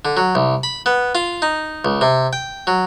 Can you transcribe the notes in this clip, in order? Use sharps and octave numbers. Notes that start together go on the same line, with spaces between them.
D3
F#3
C2
B5
B3
F4
D#4
C#2
C3
G5
F#3